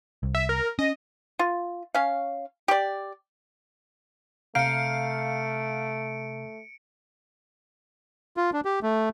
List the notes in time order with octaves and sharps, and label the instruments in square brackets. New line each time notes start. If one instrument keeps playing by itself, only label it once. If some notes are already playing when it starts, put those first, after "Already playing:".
[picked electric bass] C2
[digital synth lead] E5
A#4
[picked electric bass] C#4 [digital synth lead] D#5
[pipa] F4
C#4 F5
G4 D5
[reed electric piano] C3 A#5 G6 [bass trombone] A3 [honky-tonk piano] F5 [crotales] C#7 D7
[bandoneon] F4
D4
G4
A3